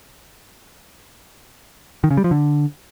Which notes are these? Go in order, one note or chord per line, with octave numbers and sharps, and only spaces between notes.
D#3
C#3
G3
F3
D3